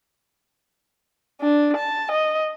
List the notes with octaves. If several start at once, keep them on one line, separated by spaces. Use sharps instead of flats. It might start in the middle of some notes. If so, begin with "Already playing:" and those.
D4
A5
D#5